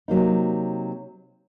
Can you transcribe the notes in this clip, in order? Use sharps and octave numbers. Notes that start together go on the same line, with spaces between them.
C3 F#3 A#3 D#4